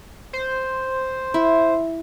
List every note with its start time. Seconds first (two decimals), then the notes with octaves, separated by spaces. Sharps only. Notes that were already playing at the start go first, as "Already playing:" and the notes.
0.33 C5
1.34 E4